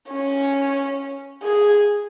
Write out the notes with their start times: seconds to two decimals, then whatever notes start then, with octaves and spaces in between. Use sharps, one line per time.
0.11 C#4
1.43 G#4